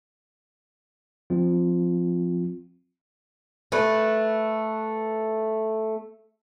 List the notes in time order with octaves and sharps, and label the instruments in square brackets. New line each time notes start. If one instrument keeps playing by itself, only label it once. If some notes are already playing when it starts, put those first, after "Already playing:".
[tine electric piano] F3 C4 F4
[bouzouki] A3 B4